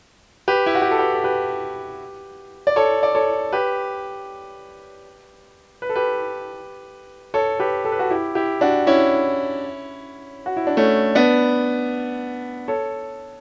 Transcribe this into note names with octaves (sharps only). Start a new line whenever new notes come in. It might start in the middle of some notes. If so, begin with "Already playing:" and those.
G4 B4
E4
F#4
G4
A4
G4 B4
A4
G4 B4
D5
A4 C#5
D5
A4 C#5
G4 B4
B4
A4
G4 B4
A4 C#5
G4 B4
A4
B4
F#4 A4
E4 G4
E4 G4
D4 F#4
C#4 E4
F#4
E4
D4
A3 C#4
B3 D4
A4 C#5